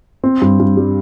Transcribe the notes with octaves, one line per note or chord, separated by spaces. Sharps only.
C4
G2
G2
G3